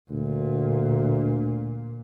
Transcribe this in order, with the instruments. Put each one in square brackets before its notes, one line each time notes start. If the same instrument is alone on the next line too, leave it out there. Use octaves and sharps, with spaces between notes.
[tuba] D2 [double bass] A#2